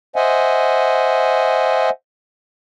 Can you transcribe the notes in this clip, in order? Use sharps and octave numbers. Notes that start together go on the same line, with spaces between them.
C5 D#5 E5 F#5 G#5